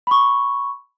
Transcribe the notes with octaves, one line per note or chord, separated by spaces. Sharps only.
B5 C#6